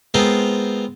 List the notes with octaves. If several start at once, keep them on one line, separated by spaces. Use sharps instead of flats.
G#3 B3 C4 F4 A#4 C5